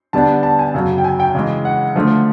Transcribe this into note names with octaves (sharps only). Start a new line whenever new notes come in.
D3 G3 B3 D4 A5
A5
G#5
F#2 C#3 F#3
G5
G#5
G5
C#3 E3 G#3
F#5
D3 F3 A3